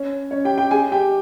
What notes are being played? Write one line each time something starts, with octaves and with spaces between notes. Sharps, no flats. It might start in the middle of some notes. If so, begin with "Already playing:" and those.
Already playing: C#4 C#5
C#4 C#5
G4 G5
G4 G5
G#4 G#5
G4 G5